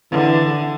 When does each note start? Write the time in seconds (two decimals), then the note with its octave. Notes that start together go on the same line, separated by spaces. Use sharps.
0.12 D3 E3